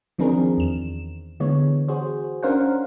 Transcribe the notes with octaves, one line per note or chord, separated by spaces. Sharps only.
D#3 F3 C4 D4 G#4 A#4
E2 E7
D3 E3 G#3 B3 C#5
F#4 G#4 C5
C#4 D4 A#4 C5 F5 F#5